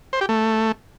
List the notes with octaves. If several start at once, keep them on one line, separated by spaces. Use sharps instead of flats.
C5
G4
A3